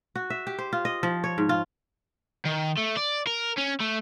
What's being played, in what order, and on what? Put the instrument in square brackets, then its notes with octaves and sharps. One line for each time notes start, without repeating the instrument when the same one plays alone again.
[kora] F#4
E5
G4
C5
F4
D#5
F3
C#5
G#2
F4
[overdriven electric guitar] D#3
A3
D5
A#4
C#4
A3